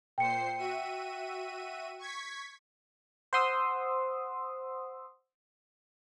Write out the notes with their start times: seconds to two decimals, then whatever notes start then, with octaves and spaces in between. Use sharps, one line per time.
0.18 A#2 C5 G5 C7 C#7
0.58 F#4 E5 D#7
1.99 C#6 G#6 B6
3.33 C5 F#5 C6 D#6 E6